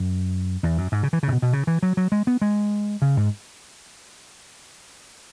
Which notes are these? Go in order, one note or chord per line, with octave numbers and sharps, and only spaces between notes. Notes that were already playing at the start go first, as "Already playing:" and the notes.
Already playing: F#2
E2
F#2
G#2
C#3
E3
C#3
G#2
B2
B2
C#3
E3
F#3
F#3
G#3
B3
G#3
C#3
G#2